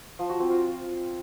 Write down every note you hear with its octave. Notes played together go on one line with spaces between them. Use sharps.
F3
F#4
C4
F4